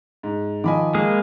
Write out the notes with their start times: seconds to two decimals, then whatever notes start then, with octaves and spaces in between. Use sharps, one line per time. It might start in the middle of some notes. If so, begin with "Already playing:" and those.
0.23 G#2
0.64 D#3 F3 D#5 G#5 B5 D6
0.94 G#3 A#3 G#4